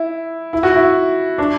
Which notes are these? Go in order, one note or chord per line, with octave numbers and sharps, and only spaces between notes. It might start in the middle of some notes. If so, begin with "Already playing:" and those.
Already playing: E4
E4
F#4
E4
D4